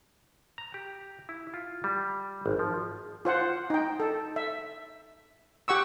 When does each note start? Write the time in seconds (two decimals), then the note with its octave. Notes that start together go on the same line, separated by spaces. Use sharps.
0.58 A#5
0.74 G4
1.29 E4
1.54 F4
1.84 G3
2.46 G#1
2.59 F3
3.25 F4 C5 F#5
3.70 D#4 G5
4.00 A4
4.36 E5
5.68 G4 F#5 C#6 E6